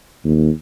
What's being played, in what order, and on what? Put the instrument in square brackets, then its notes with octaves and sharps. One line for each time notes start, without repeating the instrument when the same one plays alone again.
[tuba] D#2